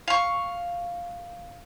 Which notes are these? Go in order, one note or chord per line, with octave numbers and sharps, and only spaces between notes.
F5 C#6